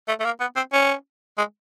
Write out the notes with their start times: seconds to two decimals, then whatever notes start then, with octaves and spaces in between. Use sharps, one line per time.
0.08 A3
0.20 A3
0.25 A#3
0.40 B3
0.56 C4
0.73 C#4
1.38 G#3